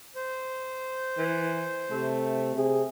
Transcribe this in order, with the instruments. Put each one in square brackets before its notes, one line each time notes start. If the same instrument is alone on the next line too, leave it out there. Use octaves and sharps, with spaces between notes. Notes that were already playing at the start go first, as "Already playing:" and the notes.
[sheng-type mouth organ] C5
[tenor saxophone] E3
[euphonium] C3 [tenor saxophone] A3
[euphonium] C3 [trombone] G#4